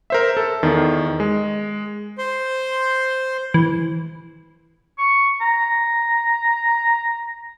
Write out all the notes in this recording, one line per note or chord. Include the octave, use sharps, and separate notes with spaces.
A#4 C5 E5
A4
E2 D#3
G#3
C5 C6
E3
C#6
A#5